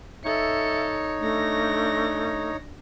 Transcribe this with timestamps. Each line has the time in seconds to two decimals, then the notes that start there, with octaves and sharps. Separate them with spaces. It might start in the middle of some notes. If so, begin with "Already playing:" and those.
0.25 D#4 A4 C#5 E5 C#7
1.21 A3 D4 A#6